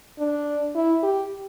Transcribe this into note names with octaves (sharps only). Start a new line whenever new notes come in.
D4
E4
G4